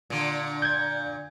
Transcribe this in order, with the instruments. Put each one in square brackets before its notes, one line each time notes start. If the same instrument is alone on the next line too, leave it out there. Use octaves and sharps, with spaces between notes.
[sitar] A#2 D3
[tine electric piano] G6 G#6